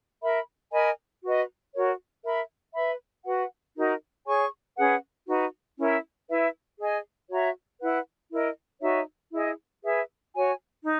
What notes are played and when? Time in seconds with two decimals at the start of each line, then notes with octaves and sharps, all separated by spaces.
0.22 A#4 E5 B5
0.71 A#4 D#5 G#5 B5
1.23 F#4 B4 D#5
1.73 F#4 A#4 C#5
2.23 A#4 E5 B5
2.75 B4 E5 B5
3.25 F#4 B4 F#5
3.76 D#4 F#4 A#4 D#5
4.26 G#4 C#5 G#5 C#6
4.76 C#4 G#4 B4 F#5
5.27 D#4 F#4 B4
5.78 C#4 E4 A#4 E5
6.29 E4 B4 E5
6.79 G#4 D#5 G#5
7.29 F#4 C#5 E5 A#5
7.81 E4 B4 F#5
8.31 E4 A#4 D#5
8.82 D#4 F#4 C#5 E5
9.32 E4 G#4 D#5
9.83 G#4 B4 E5
10.34 F#4 C#5 G#5
10.84 D#4